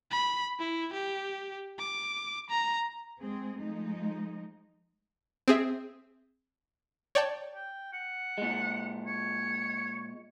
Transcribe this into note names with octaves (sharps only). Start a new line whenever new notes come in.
B5
E4
G4
D6
A#5
G#3 C4 G#4
F3 G#3 A3 D#4
C4 G#4 E5
C#5 D5 G5 A5
G5
F#5
A#2 G#3
C#5